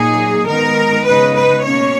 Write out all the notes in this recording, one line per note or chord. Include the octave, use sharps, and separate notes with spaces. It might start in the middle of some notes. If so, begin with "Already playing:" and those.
Already playing: A#2 F#3 A#3 D#4 G#4
D#3 G#3 B3 D#4 A#4
C#3 G#3 B3 D#4 B4
B4
B2 A#3 C#4 C#5